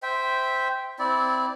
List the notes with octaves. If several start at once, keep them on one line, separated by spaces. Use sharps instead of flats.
C5 E5 G5
C4 E4 D5